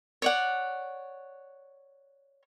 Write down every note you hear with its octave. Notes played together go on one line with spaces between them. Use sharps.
C#5 D5 F#5